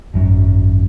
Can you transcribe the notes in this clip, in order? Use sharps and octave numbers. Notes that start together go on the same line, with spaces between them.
G#1 F#2